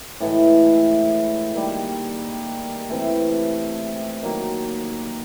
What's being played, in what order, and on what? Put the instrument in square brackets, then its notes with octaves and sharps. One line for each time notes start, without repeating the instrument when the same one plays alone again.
[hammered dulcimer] A2 E3 G#3
D#3 G3 A#3
C3 E3 A3
D#3 F#3 A#3